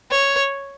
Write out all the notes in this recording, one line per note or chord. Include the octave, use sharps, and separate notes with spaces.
C#5